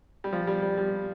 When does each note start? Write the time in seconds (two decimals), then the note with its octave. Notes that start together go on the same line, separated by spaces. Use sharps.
0.24 G3
0.33 F3
0.47 G3
0.62 G3
0.78 G3